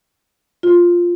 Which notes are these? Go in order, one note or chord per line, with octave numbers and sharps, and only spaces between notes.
F4